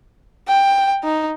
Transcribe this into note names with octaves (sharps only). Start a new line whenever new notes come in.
G5
D#4